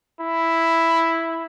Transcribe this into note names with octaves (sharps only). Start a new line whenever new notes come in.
E4